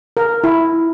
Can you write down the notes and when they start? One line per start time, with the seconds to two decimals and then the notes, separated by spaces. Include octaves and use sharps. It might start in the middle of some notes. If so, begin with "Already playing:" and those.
0.17 A#4
0.44 E4